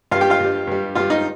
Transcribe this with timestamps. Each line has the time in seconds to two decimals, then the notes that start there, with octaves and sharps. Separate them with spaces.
0.11 G2 G3 F4 F5
0.21 G4 G5
0.30 F4 F5
0.40 G2 G3
0.67 G2 G3
0.95 G2 G3 F4 F5
1.10 D#4 D#5